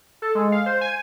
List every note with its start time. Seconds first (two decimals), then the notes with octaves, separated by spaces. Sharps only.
0.22 A4
0.35 G#3
0.52 F5
0.66 C5
0.81 G#5